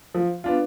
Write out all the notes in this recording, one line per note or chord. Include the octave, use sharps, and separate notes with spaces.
F3
B3 D4 F4